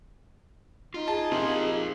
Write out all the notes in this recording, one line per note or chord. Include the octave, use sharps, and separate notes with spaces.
D#4 F4
G#4 A5
C3 F4 A#4 C5